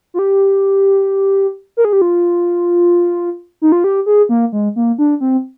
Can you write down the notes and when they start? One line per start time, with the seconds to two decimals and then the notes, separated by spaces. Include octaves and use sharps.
0.14 F4
0.19 G4
1.77 A#4
1.85 G#4
1.93 G4
2.02 F4
3.62 D#4
3.72 F4
3.84 G4
4.06 G#4
4.29 A#3
4.52 G#3
4.76 A#3
4.98 D4
5.21 C4